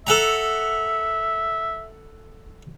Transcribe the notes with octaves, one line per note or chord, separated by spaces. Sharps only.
A4 E5 F#5 A#5